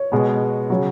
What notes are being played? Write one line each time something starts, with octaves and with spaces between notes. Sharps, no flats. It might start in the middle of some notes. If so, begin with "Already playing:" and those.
Already playing: C#5
B2 G#3 B3
C#3 F#3